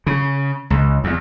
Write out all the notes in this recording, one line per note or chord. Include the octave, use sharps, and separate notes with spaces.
C#3
C#2
E2